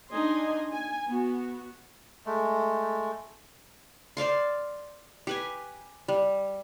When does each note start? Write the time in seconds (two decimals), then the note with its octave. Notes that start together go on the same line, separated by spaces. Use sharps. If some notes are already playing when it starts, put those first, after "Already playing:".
0.12 D4 D#4 D#5 G#5 C6
0.71 G#5
1.07 B3 F#4
2.26 G#3 A3
4.17 C5 D5 F5 C6
5.27 G4 B4 G#5
6.08 G3